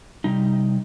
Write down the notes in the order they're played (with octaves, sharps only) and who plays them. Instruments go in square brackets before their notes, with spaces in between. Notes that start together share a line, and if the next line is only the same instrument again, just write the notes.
[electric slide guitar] C3 G3 D#4